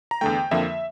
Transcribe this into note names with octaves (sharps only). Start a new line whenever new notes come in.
A#5
E2 D3 A3 G5
F2 D3 F3 A#3 E5